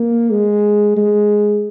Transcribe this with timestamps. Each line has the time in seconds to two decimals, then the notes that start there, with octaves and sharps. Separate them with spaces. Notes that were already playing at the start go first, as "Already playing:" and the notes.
Already playing: A#3
0.30 G#3
0.96 G#3